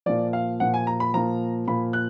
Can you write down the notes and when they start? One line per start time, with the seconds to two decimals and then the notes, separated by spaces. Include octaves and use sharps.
0.06 A#2 F3 D5
0.33 F5
0.60 A#2 F3 F#5
0.74 G#5
0.87 A#5
1.00 B5
1.14 A#2 F3 A#5
1.67 A#2 F3 B5
1.93 F#6